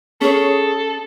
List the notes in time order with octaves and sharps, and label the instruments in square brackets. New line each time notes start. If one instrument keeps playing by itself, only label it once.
[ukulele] C#4 C#5 [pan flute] G#4 [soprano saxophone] A4